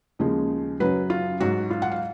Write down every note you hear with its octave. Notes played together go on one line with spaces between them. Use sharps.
D#2 C#3 F3 G#3
F#2 C#3 F#3 B4
F4
G#2 F#3 F#4
F4
F#5
F5